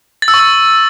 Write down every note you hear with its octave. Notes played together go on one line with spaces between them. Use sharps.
A6
E6
C#6
E6